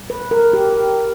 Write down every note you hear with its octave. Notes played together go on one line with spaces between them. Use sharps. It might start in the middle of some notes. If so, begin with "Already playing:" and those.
Already playing: A#2 G3
B4
A#4
G4